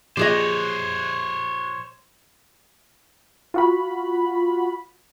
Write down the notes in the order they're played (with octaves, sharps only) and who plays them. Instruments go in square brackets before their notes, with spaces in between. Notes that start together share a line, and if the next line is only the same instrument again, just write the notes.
[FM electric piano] A#2 F3 F#6 [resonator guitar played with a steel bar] G4 G#4 D#5 [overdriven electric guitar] C5 C#5
[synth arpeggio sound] F4 F#4 B5